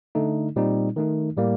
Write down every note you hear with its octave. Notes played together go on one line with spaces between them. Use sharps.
D3 A3 D#4
A#2 G3 C4 D#4
D#3 A3 D#4
A2 G3 A#3